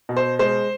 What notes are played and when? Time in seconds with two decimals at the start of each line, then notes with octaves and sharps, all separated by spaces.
0.09 B2
0.17 C5
0.39 G#3 C5